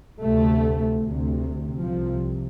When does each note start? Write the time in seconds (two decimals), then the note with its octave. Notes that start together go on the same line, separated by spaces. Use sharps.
0.22 D2 C3 A3
1.02 D2 C3
1.82 C2 C3 F3